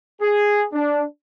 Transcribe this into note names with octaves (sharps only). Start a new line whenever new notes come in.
G#4
D4